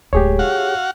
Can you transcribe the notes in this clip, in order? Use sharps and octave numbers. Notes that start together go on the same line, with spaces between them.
D1 G#3 G4 G#4 C#5
D#4 F#4 F5 F#5